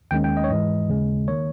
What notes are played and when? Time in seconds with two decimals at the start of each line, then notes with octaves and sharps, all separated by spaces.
0.11 D#2 D#3 G#3 C#4 G5
0.24 G5
0.37 D#5
0.44 C#5
0.50 G#2 E3 G#3 D#5
0.89 D#2 C#3 G#3
1.28 D#3 A#3 C#5